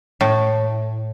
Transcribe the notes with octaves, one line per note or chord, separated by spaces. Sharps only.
A2